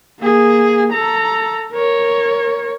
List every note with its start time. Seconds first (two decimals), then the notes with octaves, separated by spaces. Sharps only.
0.20 A#3 G#4
0.93 A4 A#5
1.72 A#4 C#5